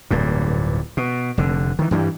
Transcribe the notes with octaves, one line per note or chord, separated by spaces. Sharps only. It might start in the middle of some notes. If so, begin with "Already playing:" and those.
D1 G2 A#2
B2
F1 D3
D#3 E3
G2 E3 F3 G3